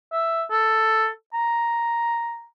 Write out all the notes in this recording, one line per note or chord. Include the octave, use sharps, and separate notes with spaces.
E5
A4
A#5